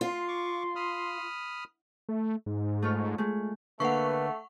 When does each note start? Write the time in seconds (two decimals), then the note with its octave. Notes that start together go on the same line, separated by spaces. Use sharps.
0.01 F4 C6
0.28 C#6 D6
0.76 B5 D#6 F6
2.09 A3
2.46 G#2
2.82 A3 F4 C#5
3.18 G#3 A3
3.80 D3 A3 A#3 B4 F#5 C#6